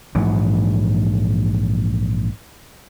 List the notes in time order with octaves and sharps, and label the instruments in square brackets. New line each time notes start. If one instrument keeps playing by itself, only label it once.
[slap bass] A#1 G#2 E3 F#3